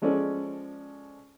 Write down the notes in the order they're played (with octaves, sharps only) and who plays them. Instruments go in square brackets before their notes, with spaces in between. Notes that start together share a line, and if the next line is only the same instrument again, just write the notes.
[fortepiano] F3 G#3 C#4 A4 D5